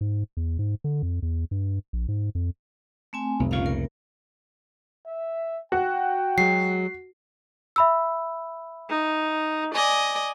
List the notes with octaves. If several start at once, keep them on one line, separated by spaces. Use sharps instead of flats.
G#2
E2
G#2
D3
F2
E2
G2
A#1
G#2
F2
A3 C4 G#5
F1 B1
C2 A#2 C#3 C#4 F4 F5
A#4
E5
F#4 G5
F#3 G#3 C7
E5 B5 E6
D#4
D5 D#5 G#5